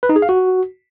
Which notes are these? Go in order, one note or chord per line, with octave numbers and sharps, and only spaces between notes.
B4
D#4
G#4
F5
F#4